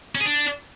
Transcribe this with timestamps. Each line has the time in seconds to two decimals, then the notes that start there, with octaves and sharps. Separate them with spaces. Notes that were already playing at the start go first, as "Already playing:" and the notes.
0.15 C#4
0.20 G#4
0.25 D4